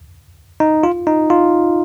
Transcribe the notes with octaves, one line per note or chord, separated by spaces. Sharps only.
D#4
F4
D#4
F4